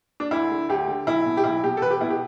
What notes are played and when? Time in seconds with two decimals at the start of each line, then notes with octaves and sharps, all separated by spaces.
0.20 D4
0.31 D2 E4
0.51 D3
0.69 D2 G4
0.88 D3
1.07 B1 E4
1.26 B2
1.37 G4
1.44 B1 E4
1.63 B2 G4
1.77 A4
1.81 E1 B4
1.91 G4
2.01 B2 E4
2.10 G4